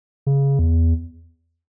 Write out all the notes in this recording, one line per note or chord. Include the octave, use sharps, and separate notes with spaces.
C#3
E2